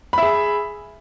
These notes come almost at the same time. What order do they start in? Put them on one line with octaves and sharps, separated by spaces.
B5 E5 G#4